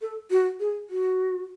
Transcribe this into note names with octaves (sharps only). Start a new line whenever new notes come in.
A4
F#4
G#4
F#4